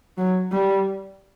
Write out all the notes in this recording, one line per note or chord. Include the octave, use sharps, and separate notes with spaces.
F#3
G3